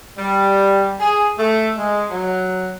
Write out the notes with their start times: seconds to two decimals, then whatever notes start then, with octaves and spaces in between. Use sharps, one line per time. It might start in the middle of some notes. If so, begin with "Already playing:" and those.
0.17 G3
1.00 G#4
1.38 A3
1.76 G#3
2.09 F#3